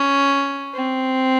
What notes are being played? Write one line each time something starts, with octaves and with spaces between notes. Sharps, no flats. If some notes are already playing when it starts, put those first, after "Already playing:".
Already playing: C#4
C4